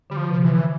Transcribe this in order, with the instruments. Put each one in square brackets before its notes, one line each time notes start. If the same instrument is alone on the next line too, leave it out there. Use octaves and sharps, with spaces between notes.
[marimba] D3 [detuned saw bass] G3
[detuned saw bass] F3
[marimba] C3
[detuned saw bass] E3
[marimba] D3